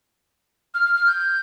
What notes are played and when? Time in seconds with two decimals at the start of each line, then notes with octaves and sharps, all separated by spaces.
0.74 F6
0.85 F6
0.96 F6
1.07 G6